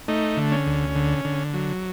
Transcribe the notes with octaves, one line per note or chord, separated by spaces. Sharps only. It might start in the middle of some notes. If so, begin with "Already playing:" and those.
A3 D#4
D3
C#4
D2
D3
D3
F#3